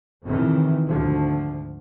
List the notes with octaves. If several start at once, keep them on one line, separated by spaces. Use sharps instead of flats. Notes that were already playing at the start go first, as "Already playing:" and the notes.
F2 A2 C3 D#3 E3
D2 G#2 D3 F3